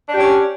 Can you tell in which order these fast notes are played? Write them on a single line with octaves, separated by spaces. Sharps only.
D4 G4 C#4